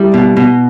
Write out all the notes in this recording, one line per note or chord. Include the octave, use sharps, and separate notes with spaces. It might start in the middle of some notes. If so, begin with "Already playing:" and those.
Already playing: G3 E4
B2
B2